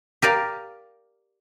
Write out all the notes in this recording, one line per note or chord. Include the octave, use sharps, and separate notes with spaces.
G4 A#4 D5 F5